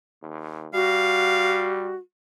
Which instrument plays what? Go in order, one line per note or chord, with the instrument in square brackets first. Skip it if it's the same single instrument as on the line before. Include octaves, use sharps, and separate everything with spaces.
[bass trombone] D#2
[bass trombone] G3 [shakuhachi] F#4 [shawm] F5